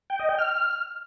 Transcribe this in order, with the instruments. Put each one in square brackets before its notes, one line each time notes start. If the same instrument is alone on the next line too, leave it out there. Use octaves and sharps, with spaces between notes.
[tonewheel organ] G5
D#5
G5
F6